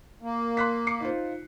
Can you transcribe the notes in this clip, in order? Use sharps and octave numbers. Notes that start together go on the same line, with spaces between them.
A#3
C6 F#6 B6
D6 C7 C#7
D#4 F4 C5